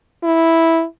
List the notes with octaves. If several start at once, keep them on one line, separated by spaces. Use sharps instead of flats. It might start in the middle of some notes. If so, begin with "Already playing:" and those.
E4